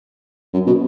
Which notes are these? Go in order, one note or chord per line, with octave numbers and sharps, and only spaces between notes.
F#2
B2